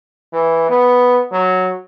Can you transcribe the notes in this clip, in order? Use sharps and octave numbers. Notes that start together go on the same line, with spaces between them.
E3
B3
F#3